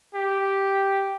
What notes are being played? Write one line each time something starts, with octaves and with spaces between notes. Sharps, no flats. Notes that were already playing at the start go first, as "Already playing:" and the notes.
G4